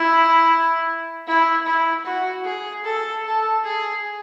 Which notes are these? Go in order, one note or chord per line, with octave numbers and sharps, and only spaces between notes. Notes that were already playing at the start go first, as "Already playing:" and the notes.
Already playing: E4
E4
E4
F#4
G#4
A4
A4
G#4